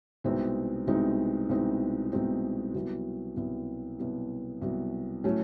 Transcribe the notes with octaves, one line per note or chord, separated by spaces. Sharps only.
C2 B2 G#3 C4 D#4
C2 B2 G#3 C4 D#4
C2 B2 G#3 C4 D#4
C2 B2 G#3 C4 D#4
C2 B2 F#3
C2 B2 F#3
C2 B2 F#3
C2 B2 F#3
A2 F#3 A3 C#4